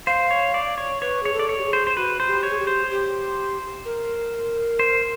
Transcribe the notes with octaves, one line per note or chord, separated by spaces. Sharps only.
C5 F5
C#5
D5
C#5
B4 C#5
G#4 C#5
A4
D5
C#5
G4
G#4
C5
C5
F#4 B4
C5
G4
C#5
G#4
G4
C5
G4
A#4
C5